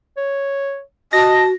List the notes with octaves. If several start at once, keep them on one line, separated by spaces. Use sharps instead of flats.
C#5
F#4 D#5 A5 A#6